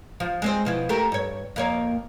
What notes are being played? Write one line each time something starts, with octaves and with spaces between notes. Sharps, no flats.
F3
G#3 C4 C5
B2 F3 E4
A3 G4 A#4
G2 C#5
F2 A#3 C#5